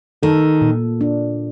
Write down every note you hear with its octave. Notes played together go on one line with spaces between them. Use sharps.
D#3 A4
A#2
D4